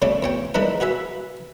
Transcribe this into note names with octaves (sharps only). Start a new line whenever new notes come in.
C#3 A3 C#4 D4 D5
E2 C#5 G5
E3 G#3 D4 D#4 A#4 B4
F#4 G#4 B4 E5